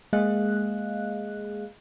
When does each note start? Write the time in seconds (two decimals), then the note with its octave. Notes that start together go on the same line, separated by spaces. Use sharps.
0.13 G#3 A#3 G#4 D#5 F5 F#6